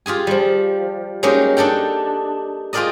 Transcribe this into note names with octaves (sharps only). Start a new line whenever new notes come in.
F4 G4 G#4 G#5
F3 G3
F#3 G#3 A#3 C#4 D#4 G4
D4 D#4 A4 G5
F4 G4 G#4 A#4 D5 D#5